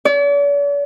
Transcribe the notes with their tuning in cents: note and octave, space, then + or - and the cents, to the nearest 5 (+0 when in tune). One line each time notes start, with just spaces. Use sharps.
D5 -45